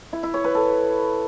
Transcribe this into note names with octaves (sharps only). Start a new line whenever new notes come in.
E4
E4
C#5
B4
A4